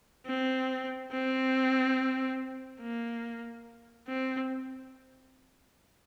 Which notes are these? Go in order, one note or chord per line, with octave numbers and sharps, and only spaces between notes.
C4
C4
A#3
C4